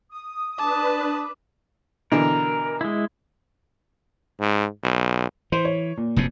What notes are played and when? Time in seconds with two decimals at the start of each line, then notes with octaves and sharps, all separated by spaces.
0.10 D#6
0.59 D4 B4 A5 D6
2.12 B2 D3 E3 A#4
2.81 G#3 E4
4.40 G#2
4.84 B1
5.52 E3 C5
5.65 C#5
5.97 A#2
6.16 F1 F#2 C3